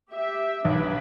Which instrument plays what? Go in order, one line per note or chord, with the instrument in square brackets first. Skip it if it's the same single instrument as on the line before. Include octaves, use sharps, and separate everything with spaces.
[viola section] G4 E5
[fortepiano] B1 [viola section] D4 B4